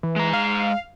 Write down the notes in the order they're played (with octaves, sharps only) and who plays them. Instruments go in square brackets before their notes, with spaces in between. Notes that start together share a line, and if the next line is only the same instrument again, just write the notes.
[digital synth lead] E3
[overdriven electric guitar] G#3 A#5
[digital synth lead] F5